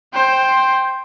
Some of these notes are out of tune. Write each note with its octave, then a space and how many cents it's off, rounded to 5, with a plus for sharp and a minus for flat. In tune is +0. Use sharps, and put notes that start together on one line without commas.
C5 +10 G5 +0